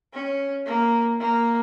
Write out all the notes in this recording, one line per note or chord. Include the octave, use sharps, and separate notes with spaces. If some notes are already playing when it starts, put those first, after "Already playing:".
C#4
A#3
A#3